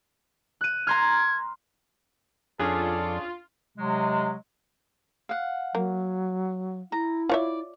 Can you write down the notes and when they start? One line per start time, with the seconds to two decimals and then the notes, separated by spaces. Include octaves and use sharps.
0.61 F#6 D#7
0.87 A#5 C6 F6 G#6
2.60 F2 C#4 D4 F4 G#4 A4 D5
3.78 C3 F#3 G#3
5.29 F5 F#5
5.75 F#3 A#3
6.92 E4 A#5
7.29 F4 C#5 D5 E5